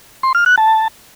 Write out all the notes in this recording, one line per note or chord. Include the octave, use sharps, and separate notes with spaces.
C6
F6
F#6
A5